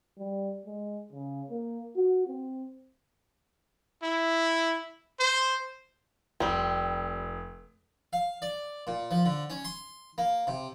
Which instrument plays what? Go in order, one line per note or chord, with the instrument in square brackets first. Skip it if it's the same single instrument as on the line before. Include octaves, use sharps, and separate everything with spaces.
[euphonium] G3
G#3
C#3
A#3
F#4
C4
[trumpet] E4
C5
[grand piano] F1 [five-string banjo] G3 C4
[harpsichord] F5
D5
A#2
F3
D3
C#4
C6
A#3
C3